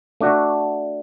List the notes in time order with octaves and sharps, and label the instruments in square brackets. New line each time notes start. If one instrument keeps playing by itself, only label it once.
[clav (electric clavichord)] A3 D4 F#4